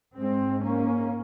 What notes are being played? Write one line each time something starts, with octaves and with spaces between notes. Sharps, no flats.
G#2 G#3 C4
A#3 C#4